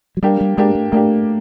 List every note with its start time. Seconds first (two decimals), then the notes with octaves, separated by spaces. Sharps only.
0.17 F#3
0.23 G3 A#3 D4 G4
0.41 G3
0.57 G#3 A#3 D4 G4
0.75 A3
0.92 A3 A#3 D4 G4